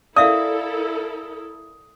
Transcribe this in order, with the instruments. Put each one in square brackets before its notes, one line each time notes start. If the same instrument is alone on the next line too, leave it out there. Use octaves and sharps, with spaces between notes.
[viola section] E4 A4 A#4 [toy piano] D5 E5 F5 [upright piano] D#6